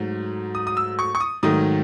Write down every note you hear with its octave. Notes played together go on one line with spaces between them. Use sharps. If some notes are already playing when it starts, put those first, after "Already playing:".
Already playing: G#2 F#3 A3
D#6
D#6
E6
C#6
C#6
D#6
G#2 D#3 F#3 A3 D#6